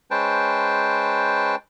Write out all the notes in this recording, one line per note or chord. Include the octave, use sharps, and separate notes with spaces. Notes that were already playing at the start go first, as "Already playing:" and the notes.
G#3 C#4 B4 C5 G5 A5